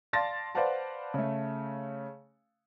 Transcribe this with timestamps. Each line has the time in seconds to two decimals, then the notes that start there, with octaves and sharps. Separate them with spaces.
0.13 D5 F5 A5 C6 A6 A#6
0.55 B4 C5 D5 F5 F#5 A5
1.14 C#3 A3